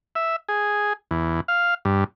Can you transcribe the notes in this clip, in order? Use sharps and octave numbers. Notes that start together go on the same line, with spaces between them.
E5
G#4
E2
F5
G2